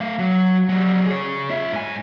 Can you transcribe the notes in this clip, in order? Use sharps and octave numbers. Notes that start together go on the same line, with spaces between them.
A3 F5
F#3
F#3 G3
G#4 C#5
F4 E5
G#2 G#5